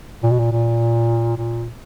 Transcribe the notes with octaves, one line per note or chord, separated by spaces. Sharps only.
A#2
B2
A#2
A#2
A#2